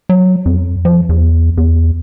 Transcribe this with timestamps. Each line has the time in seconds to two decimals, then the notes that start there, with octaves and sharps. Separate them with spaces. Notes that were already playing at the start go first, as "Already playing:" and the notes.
0.09 F#3
0.46 F2
0.85 F3
1.09 E2
1.57 E2